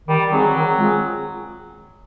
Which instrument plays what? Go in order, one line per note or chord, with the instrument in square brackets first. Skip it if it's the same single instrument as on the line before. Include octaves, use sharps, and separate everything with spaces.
[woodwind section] D#3 [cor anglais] G3
[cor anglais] F#3 [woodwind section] G3 C4 D#4 G#4
[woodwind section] D#3
G#3 C4 F4 G#4